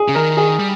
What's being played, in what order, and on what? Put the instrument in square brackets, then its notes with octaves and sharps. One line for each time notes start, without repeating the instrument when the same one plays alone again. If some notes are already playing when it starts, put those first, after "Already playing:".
Already playing: [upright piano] G#4
[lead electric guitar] C#3
[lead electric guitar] D#3 [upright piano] A#4
[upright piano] G#4
[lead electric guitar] G3